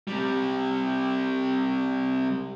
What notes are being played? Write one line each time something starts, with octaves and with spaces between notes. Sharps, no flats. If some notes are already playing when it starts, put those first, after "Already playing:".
C3 G3